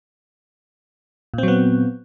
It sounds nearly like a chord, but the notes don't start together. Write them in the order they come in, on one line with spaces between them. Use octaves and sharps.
A#2 C4 F#3 B3